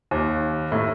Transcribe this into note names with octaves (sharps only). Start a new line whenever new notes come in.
D#2
A2